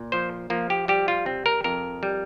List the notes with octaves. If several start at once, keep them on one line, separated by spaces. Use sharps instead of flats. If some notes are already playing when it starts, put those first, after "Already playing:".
Already playing: A#2
F3 C5
F3 A#3
G4
G3 G4
F4
C3 C4
A#4
F2 A#4
G3